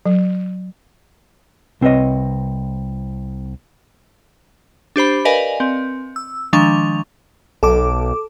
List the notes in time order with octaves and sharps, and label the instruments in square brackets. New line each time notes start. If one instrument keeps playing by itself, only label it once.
[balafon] F#3
[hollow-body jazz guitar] C2 C4 B4 C#5 D#5
[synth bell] D4 G4 C5 B5
A#4 B4 D5 D#5 F5 G#5
C4
E6
D#3 F3 G#3 D4 C#6 F7
[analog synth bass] B1 [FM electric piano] A4 D6